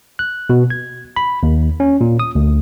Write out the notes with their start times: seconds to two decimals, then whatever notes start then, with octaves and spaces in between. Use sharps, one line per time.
0.19 F#6
0.50 B2
0.70 G#6
1.16 B5
1.43 D#2
1.80 C#4
2.01 A#2
2.20 D#6
2.35 D2